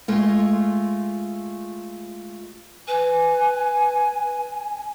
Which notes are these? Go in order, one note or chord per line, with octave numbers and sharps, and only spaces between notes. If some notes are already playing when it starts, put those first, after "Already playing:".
G#3 A3 F4
B4 G#5